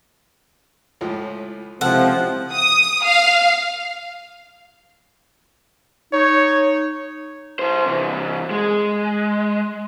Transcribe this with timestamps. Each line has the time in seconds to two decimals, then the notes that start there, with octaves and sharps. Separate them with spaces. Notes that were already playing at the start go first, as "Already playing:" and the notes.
1.01 C#2 A2 F3
1.81 C#2 C3 F3 C4 E4 A4 F#5
2.52 D#6
3.04 F5
6.13 D#4 C#5
7.59 E4 C5
7.86 C3 E3
8.51 G#3